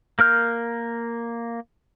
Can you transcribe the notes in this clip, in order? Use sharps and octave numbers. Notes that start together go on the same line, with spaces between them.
A#3 A#4 F6 G6